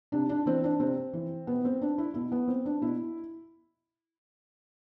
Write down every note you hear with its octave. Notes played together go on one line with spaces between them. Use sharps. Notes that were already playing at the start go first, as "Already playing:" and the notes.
C3 D4
D4
E3 C4
D4
C3 C4
E3
B2 B3
C4
D4
E4
B2 E4
B3
C4
D4
B2 E4